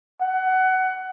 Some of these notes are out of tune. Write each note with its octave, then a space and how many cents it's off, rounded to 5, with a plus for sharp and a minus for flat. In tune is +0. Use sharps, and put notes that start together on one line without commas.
F#5 +20